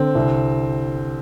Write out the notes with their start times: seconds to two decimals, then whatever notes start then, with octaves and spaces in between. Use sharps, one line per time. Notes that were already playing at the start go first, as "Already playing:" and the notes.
Already playing: D3 C4
0.15 C2